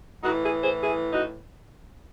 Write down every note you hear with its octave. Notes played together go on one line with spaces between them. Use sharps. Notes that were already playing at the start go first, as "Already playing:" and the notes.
A2 E3 D#4 F#4
E4 G#4
G#4 C5
E4 G#4
D#4 F#4